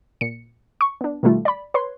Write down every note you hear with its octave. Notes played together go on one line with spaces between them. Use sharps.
A#2 C#7
C#6
B3 D4
B2 D#3 G3 A3 F4
D5 B5
B4 C#5 C6